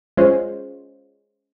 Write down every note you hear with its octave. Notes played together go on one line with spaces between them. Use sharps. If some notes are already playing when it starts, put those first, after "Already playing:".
G#3 C#4 F4 C5